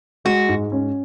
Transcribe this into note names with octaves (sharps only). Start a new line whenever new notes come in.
G#3 F#4
G#2
C#4